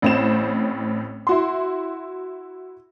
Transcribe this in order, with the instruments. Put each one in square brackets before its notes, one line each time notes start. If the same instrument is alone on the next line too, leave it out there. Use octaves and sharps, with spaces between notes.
[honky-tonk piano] A1 A2 C4 C5 E7
E4 F#4 C6